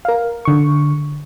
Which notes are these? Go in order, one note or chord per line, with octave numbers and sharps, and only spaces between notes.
A#4 F5
D3 C#6